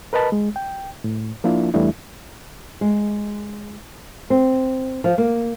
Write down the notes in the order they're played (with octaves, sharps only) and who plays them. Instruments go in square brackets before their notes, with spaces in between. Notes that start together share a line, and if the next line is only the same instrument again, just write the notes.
[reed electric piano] A#4 B4 D#5 A5 B5
G#3
G5
A2
F3 A#3 D4 E4 F4
E2 E3 G3 A3 D4 E4
[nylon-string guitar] G#3
C4
F3
A#3